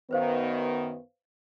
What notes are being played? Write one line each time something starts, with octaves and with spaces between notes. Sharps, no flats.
F#2 D#3 B3 B4 C5 F5